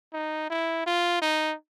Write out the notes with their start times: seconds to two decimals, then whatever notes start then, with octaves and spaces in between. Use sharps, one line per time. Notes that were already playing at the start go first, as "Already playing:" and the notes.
0.13 D#4
0.50 E4
0.86 F4
1.21 D#4